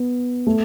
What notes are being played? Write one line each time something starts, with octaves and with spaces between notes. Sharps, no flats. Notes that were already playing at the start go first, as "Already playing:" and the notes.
Already playing: B3
A3